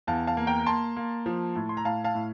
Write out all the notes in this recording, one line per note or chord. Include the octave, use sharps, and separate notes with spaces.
E2 F5 A5
F5 A5
A#3
G5 A#5
A#3 A5 C6
A#3
F3
A2
C6
A#5
A2 F5 A5
F5 A5
A2